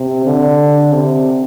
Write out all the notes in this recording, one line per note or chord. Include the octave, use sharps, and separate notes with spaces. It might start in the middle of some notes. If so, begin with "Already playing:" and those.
Already playing: C3
D3
C3